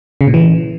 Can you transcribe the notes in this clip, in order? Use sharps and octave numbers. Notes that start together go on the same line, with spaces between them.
C#3
A#2
E3